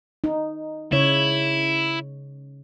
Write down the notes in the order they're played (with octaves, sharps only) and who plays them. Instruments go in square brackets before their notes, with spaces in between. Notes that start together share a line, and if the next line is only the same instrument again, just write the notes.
[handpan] D#4
[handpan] C#3 C#5 [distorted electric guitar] E4